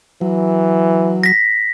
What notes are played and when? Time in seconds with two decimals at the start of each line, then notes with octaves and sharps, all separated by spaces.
0.21 E3 F#3
1.23 A#6 B6